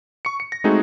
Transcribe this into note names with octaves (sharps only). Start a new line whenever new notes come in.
C#6 C#7
C#7
A#6
G#3 A3 C4 D#4 F#4 G#4